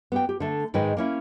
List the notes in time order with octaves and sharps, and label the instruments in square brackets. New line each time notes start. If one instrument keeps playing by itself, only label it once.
[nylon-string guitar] B3 G4 G5
G4
D3 A3
G#2 D#3 G#3 B4 G5
A#3 C#4 E4